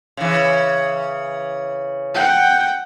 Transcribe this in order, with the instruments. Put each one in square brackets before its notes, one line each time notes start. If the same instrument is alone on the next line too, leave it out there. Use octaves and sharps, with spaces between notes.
[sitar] C#3 E3
[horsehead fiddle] F#5 G5